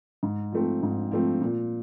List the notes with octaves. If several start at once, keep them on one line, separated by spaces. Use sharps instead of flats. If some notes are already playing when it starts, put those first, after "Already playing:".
G#2
F3 A3 C4
G#2
F3 A3 C4
A#2